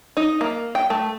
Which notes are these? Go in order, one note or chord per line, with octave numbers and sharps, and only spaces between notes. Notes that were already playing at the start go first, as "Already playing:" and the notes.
D#4
A#3
G5
A3